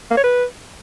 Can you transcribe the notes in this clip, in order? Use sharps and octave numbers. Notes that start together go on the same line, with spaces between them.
A#3
C#5
B4